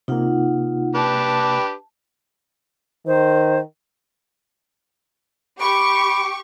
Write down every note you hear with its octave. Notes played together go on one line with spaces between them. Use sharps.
C3 A#3 D#4 F4 F#5
D4 G4 B4 A5
D#3 C5
G4 B5 C#6 D6